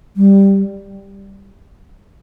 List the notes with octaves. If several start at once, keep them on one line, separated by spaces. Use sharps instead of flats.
G3